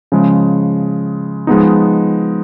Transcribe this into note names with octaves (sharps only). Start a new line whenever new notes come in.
C#3 F3 G#3
F3 G#3 B3 D#4